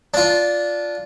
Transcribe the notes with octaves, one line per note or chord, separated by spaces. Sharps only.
D4 F4